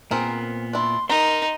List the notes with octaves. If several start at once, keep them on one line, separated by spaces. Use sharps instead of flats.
A#2 B3 C4 G#4 A#4
D4 E4 C6
D#4 A#4 A#5 C6